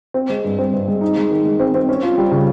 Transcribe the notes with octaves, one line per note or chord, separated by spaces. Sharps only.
C4
G#3
G2
C4
G2
G#3
D#4
G#3
D#3
G#3
C4
C4
C#4
F4
G3
C#3